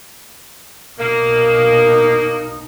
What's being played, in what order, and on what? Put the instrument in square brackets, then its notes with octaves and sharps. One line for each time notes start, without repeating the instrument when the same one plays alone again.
[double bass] B2 D#4 [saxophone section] A#3